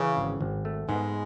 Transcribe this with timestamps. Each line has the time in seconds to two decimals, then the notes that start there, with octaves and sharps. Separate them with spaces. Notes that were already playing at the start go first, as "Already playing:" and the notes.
Already playing: C#3 E3
0.17 G#1
0.41 G#1
0.65 A3
0.88 G#2 G#3 B3